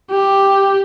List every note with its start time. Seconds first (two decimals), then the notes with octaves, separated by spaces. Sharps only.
0.12 G4